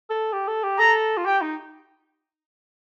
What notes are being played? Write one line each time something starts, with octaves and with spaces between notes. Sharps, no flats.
A4
G4
A4
G4
A4 A#5
F4
G4 G5
D#4